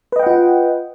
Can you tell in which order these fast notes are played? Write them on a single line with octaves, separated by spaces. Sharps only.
B4 D#5 G5 F#5 F4